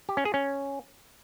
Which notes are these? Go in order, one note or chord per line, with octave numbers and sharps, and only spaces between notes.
G4
C#4
G#4
C#4